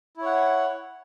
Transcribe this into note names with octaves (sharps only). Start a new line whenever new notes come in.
E4 C#5 F#5